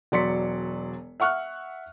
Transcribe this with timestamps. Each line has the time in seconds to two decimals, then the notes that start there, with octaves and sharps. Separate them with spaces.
0.12 E1 F#3 D5 C6 B6 C#7
1.20 E5 F#5 C#6 F6 F#6